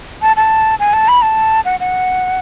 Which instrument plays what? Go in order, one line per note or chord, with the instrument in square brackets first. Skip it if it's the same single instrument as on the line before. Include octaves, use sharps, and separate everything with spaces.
[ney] A5
A5
G#5
A5
B5
A5
F#5
F#5